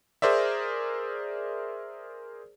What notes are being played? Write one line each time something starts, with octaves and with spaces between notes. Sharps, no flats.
G#4 A#4 C5 D5 E5